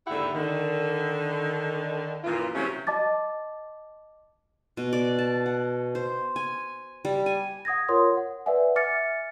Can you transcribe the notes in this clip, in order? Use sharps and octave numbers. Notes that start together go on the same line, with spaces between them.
D#2 G#2 D3 E4 G4 F#5
D3 D#3
F#2 A#2 E3 F4
C3 E3 F#3 A3 C#4
D#5 A5 D6 A6
B2
D5
A5
F#5
C5
G#5
G3
G#5
F#5 D#6 G#6 A#6
F4 A#4 C#5 F#5 C6 D#6
F#5
B4 D5 E5 F#5 G#5
E5 G#5 D6 F6 A6 C#7